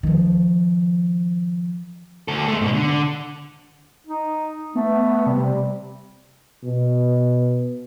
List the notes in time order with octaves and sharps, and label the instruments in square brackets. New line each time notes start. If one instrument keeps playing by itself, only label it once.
[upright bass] D#3 F3
[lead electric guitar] D2 A4
G#3 A3
G#2 B2
D3
[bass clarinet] D#4
[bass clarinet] A3 [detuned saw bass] B3
[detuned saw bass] C3 [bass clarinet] G3
[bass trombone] B2